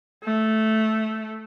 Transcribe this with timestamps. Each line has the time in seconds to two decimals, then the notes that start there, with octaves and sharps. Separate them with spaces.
0.24 A3